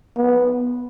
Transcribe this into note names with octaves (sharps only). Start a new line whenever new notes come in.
B3